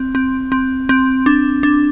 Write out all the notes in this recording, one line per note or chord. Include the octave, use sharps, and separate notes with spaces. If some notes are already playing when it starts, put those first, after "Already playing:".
Already playing: C4
C4
C4
C4
D4
D4